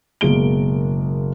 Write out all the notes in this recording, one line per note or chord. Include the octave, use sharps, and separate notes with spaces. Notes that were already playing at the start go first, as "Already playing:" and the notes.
F#1 B2 G#3 A#3 D7 G7